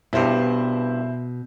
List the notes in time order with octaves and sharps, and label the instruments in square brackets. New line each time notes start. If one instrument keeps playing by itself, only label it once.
[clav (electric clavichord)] C2 G2 [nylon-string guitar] B2 [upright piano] E4 C5